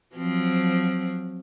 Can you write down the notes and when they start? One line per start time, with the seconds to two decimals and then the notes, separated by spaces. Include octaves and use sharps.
0.15 F3 F#3 C4